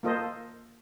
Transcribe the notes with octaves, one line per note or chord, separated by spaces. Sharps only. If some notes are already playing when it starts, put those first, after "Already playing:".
A#3 F4 A4 C5 D#5